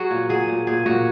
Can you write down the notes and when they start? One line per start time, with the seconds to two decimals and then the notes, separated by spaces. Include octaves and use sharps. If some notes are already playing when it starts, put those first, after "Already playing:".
Already playing: F#3 F#4 G#4
0.11 A#2
0.29 F#3 G#4
0.48 A#2
0.67 A#2 G#4
0.86 A#2 F#4